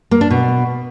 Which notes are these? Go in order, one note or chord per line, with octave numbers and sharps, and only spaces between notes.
A#3
D4
B2